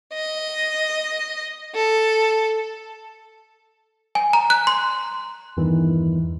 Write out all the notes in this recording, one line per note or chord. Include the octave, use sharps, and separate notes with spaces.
D#5
A4
G#5
A#5
F#6
C6
E2 G2 D#3 E3